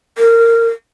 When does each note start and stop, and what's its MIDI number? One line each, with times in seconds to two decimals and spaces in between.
0.18 0.67 70